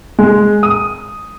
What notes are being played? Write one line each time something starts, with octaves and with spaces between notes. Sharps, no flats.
G#3
D#6